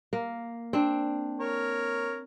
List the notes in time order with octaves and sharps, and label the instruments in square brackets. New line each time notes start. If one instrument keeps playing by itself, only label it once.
[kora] A#3
C4 D4
[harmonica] A#4 C#5